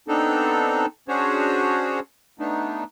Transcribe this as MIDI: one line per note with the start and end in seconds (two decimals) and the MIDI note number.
0.08 0.86 59
0.08 0.86 60
0.08 0.86 62
0.08 0.86 63
0.08 0.86 69
1.08 2.00 61
1.08 2.00 62
1.08 2.00 66
1.08 2.00 68
1.08 2.00 72
1.08 2.00 73
2.39 2.84 57
2.39 2.84 59
2.39 2.84 62
2.39 2.84 63